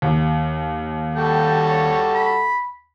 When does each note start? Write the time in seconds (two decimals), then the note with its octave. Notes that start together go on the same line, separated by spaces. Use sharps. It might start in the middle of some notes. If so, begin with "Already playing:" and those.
0.02 D#2
1.14 G3 F#4 A4 G5
1.65 C#5
2.15 B5